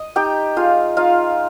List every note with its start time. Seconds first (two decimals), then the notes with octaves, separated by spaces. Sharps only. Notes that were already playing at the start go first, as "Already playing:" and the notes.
Already playing: D#5
0.16 D#4 G4 G5
0.56 G#3 F4 F5
0.96 D#4 F4 F5